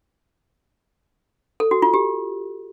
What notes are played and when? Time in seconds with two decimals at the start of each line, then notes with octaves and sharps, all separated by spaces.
1.60 A4
1.71 F#4
1.82 F4
1.94 G4